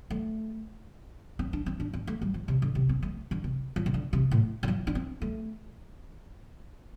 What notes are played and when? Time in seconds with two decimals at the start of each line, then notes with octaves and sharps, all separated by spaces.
0.10 A3
1.39 C4
1.53 D4
1.66 C4
1.80 D4
1.93 C4
2.07 A3
2.22 G3
2.34 F3
2.48 C3
2.62 D3
2.75 C3
2.89 C4
3.02 A3
3.31 D3
3.44 C3
3.76 F3
3.86 C3
3.94 D3
4.13 C3
4.31 A2
4.63 D3
4.68 F3
4.87 D4
4.95 C4
5.22 A3